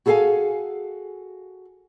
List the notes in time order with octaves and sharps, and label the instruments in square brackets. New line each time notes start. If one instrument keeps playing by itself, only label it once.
[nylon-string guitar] F#4 G#4 A4 E5 F5 G#5